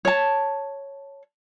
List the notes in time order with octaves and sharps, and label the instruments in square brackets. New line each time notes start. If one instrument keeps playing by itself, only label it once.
[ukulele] C#5 A5